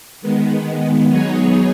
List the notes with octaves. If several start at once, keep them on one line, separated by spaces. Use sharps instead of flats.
D#3 G#3 B3
F#3 B3 D#4 G#4 C#5